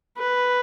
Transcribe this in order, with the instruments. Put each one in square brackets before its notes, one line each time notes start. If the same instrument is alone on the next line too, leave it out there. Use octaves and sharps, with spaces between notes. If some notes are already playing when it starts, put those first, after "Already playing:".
[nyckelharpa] B4